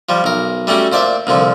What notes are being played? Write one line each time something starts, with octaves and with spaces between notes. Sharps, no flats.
F3 G3
B1 A#4
G3 A3 C#4 F#4 G4
A#2 C5 D5 E5
C2 A#2 D3 F3